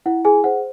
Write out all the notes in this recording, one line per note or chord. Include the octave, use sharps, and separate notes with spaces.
E4 F#5
G#4 G#5
G#4 C5 F#5